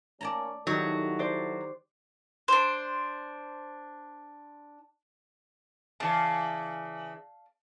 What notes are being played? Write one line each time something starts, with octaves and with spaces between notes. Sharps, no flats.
A#3 C#4 D5 A5 A#5
D#3 F#3 G3 E4 F#4 A4
C5 D5
D4 C5
C#3 E3 D5 F5 A5